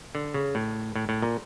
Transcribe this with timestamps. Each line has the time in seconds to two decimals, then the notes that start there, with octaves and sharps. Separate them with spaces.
0.15 D3
0.34 C#3
0.55 A2
0.96 A2
1.09 A2
1.22 A#2